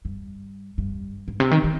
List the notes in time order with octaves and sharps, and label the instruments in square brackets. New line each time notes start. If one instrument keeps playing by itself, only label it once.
[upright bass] G2
G2
G#2
C3
D#3
D#3